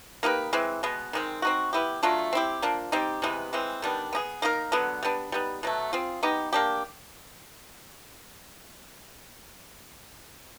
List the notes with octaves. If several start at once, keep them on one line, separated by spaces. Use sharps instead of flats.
A#3 D#4 G4 B4
E3 G#3 C4
B2 G#3 B3
D#3 G#3 C4
C4 D#4 F#4
B3 E4 G4
F#3 A3 D4 F4
C4 E4 G4
F3 A#3 D4
G3 C4 D#4 G4
C3 E3 G#3 B3
E3 G#3 C4
D#3 G3 B3 D4
B3 D#4 G#4
A#3 D#4 G4 A#4
D3 F#3 B3
G3 B3 D4
G3 B3 D#4
B2 F#3 A3
C4 F4 G#4
B3 D#4 G4
A#3 D4 G4